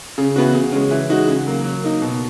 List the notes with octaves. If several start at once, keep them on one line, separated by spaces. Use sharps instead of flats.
C#3
E3 B3 F#4
C#3
G#3 C#4
E3
G#3 D#4 F#4
C#3
F#3 A#3
F#3
A#3 D#4
B2